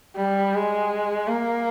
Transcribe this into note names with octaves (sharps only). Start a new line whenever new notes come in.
G3
G#3
A#3